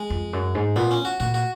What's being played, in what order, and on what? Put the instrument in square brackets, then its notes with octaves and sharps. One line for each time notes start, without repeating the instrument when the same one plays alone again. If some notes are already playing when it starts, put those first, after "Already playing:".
Already playing: [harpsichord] G#3
[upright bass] F2
F#2
G#2
[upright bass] A#2 [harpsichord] B3
[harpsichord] C#4
F#4
[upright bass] A#2 [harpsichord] F#4
[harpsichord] F#4